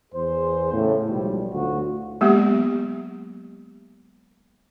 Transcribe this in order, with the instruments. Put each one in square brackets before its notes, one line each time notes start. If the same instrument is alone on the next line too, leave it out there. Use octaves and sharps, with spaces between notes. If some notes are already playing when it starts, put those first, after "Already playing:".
[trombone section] E2 G#4 C5
A2 C#3
B1 G#2 F3 G3
D2 A2 F4 F#4
[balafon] F#3 G#3 A#3 B3 G4